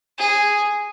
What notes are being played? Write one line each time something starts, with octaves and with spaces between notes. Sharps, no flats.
G#4